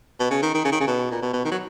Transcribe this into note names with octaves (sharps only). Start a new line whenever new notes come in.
B2
C#3
D#3
D#3
C#3
D#3
C#3
B2
A#2
B2
B2
D#3
F#3